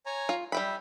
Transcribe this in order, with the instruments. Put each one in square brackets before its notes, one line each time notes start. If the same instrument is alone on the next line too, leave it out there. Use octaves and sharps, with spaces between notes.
[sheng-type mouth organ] C#5 G#5 A#5
[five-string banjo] F4
[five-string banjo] G3 G5 B5 [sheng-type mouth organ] E5